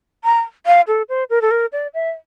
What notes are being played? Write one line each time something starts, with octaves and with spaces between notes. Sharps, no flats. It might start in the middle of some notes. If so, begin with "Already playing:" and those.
A#5
F5
A4
C5
A#4
A4
A#4
D5
E5